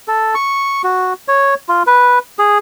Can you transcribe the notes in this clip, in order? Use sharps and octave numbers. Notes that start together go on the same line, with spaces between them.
A4
C#6
F#4
C#5
F4
B4
G#4